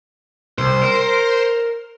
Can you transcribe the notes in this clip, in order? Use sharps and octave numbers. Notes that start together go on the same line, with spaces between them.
C2 C5
A#4